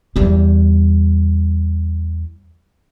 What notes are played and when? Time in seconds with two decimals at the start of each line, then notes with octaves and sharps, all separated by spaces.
0.16 E2 G3